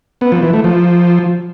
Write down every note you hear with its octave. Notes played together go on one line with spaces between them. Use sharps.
B3
F3
E3
A3
F3